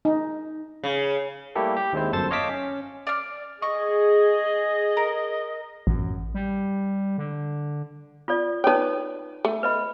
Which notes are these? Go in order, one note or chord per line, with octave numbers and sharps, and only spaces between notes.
D#4
C#3
G3 A3 A#3 E4 G4 A4
G4
D#2 G#3 C4 E4 C5
G1 F#2 A4 C5 A5 A6
C#5 D#5 F5 A5 D6 B6
C#4
D5 F6
G#4 D#5 C#6
A#4
A1 F#2
G3
D3
F4 A4 D5
D#4 A4 B4 C#5 G5
A3
B4 D#5 B5